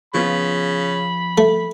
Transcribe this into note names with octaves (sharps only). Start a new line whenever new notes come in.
C#3 F3 B3 F4 B5
A3